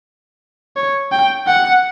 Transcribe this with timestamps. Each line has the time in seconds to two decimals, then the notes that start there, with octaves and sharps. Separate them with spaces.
0.76 C#5
1.12 G5
1.47 F#5